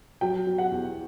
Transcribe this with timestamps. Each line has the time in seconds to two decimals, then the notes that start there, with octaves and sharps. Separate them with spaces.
0.21 F#3 G5
0.47 F#3
0.58 F#5
0.71 E2